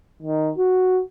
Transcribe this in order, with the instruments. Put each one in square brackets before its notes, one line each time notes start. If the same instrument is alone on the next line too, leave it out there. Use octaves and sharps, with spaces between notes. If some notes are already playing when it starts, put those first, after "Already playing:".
[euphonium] D#3
F#4